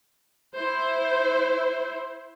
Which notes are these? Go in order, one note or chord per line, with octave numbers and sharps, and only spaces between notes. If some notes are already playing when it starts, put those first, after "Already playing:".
E4 C5